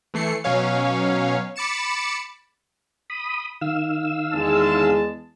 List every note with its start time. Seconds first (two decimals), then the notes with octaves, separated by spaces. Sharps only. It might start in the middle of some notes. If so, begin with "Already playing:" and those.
0.14 E3 A3 C7 C#7
0.44 B2 F#3 C#4 C#5 F5
1.56 B5 D6 A6 C#7 E7
3.10 B5 D#6
3.61 D#3 F5 E6
4.33 E2 G#3 A5